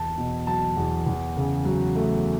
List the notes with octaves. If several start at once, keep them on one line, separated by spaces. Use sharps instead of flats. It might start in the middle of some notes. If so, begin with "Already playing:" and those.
Already playing: E2 A5
B2
F#3 A5
E2
E2
C#3
F#3
A3